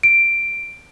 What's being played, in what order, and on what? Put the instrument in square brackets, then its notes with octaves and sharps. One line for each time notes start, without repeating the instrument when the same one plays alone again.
[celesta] D7